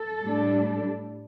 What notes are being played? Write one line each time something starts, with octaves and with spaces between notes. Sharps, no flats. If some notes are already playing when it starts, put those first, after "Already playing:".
Already playing: A4
A2 G3 D4